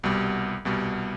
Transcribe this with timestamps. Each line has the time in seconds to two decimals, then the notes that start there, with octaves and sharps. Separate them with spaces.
0.03 C2 B2 G3
0.65 C2 B2 G3